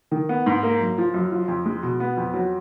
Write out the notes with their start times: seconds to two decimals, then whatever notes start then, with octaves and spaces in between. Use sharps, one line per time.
0.11 D#3
0.29 B3
0.46 G#2
0.63 A#3
0.80 F#2
0.98 F3
1.14 F#2
1.32 F3
1.48 F2
1.66 G#3
1.83 B2
2.00 B3
2.17 F2
2.34 F#3